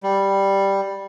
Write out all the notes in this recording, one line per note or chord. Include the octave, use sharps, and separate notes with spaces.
G3